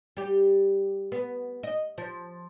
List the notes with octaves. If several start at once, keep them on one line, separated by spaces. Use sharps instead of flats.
G3 G4
B3
D#5
F3